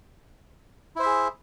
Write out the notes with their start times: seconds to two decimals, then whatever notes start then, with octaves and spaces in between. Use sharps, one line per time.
0.96 E4
0.99 C5
1.03 E5
1.06 G#4